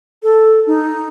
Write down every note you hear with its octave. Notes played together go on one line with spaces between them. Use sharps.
A4
D#4